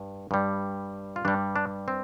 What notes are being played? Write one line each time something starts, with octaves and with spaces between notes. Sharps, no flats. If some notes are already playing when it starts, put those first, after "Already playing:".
Already playing: G2
G2 G3
F4
G2 G3 D4
D4
C4